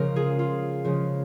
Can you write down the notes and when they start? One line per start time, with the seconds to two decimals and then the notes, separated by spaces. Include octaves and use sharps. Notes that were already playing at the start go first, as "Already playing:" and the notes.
Already playing: C#3 F3 G#3 A#4
0.16 F4 G#4
0.39 F4
0.85 C#3 F3 G#3